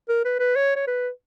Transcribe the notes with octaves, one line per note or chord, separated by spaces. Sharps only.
A#4
B4
B4
C#5
C#5
B4